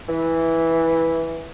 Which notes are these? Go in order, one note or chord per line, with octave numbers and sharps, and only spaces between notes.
E3